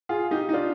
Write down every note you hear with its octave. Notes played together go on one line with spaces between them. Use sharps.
F4 G#4
D#4 G4
D#4
D4 F4